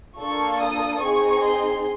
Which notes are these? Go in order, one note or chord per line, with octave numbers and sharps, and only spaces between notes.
A#3 D4 F4 A4 C#6
D#6
C4 D#4 G#4 C#6
C6